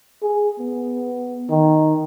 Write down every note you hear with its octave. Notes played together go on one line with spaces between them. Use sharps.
G#4
B3
D#3